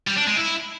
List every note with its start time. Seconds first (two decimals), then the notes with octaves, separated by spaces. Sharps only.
0.07 G3
0.17 D4
0.27 G#3
0.37 E4